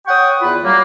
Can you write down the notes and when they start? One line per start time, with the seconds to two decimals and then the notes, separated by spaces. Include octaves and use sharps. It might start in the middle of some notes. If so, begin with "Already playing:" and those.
0.07 C#5 F#5 G5 C#6 D#6
0.40 E2 F4 B4
0.62 F#3 G3 A#3